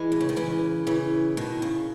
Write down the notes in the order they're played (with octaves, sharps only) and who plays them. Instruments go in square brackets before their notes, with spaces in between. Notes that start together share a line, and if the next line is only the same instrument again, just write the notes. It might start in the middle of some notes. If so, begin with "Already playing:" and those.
Already playing: [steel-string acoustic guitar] E3 G#3
B2
C#3
D#3
C#3 E3
C#3 E3
B2 D#3
C#3